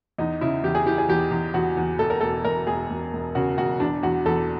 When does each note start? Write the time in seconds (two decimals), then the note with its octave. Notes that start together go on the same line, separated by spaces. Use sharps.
0.18 E2 D#4
0.41 C#3 E4
0.63 E2 G4
0.75 G#4
0.86 E3 G4
0.98 G#4
1.09 E2 G4
1.31 E2
1.54 E2 F#4
1.77 E2
1.99 E1 A4
2.10 A#4
2.21 E1 A4
2.44 E1 A#4
2.67 E1 G#4
2.90 E1
3.13 E1
3.35 C#3 F#4
3.58 E1 F#4
3.80 E2 D4
4.03 E2 F#4
4.26 E2 A4